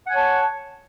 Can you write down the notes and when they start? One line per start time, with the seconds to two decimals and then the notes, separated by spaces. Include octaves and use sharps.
0.06 F#5
0.09 G#5
0.12 C#5
0.15 A5